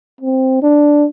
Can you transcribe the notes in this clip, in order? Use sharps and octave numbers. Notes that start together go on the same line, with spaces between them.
C4
D4